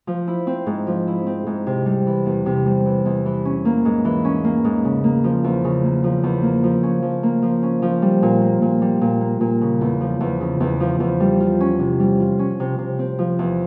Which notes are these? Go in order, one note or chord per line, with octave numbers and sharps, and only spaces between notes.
F3
E4
C4
G#2
F3
E4
C4
G#2
C3
G3
E3
E2
C3
G3
E3
E2
E3
C#4
A#3
G#2
E3
C#4
A#3
G#2
C#3
A#3
F3
E2
C#3
A#3
F3
E2
A#3
F3
C#4
F3
A#3
F3
C#4
F3
G3
A#2
A#3
A#2
G3
A#2
A#3
A#2
C#3
E2
F3
E2
C#3
E2
F3
E2
G3
F4
C#4
C3
G3
F4
C#4
C3
C3
C4
F3
E2